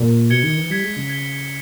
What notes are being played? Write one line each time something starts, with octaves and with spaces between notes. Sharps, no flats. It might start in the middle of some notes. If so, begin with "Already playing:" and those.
Already playing: A#2
B2 G#6 C#7 G7
D#3
E3
G3 G#6 B6 G7
G#3
C#3
G#6 B6 G7